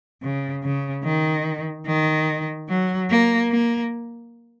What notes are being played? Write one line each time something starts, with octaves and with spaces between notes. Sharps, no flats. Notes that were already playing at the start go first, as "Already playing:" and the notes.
C#3
C#3
D#3
D#3
F#3
A#3
A#3